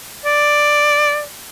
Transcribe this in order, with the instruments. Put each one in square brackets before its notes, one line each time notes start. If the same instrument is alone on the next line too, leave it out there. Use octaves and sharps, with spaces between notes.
[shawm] D5